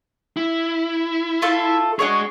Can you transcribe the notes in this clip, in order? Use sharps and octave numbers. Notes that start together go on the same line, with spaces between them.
E4
A3 F4 A4
D4 F#4 G#4 C#5 D#5